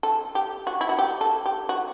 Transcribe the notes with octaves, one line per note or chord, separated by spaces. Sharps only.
A4
G4
F#4
E4
F#4
G4
A4
G4
F#4